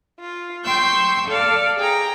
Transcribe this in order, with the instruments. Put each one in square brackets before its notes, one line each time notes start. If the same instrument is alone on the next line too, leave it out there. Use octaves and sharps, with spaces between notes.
[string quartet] F4
G5 C6 C#6 E6 G6
A4 D5 F5
G#4 G5 A#5